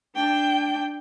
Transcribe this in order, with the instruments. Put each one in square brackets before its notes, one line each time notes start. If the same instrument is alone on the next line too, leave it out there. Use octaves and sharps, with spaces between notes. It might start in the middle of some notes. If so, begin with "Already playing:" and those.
[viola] D4 G5